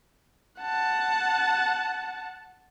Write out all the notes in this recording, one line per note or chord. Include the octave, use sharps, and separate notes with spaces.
F#5 A5